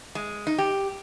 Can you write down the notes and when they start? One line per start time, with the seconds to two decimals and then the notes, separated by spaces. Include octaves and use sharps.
0.15 G#3
0.47 D#4
0.58 G4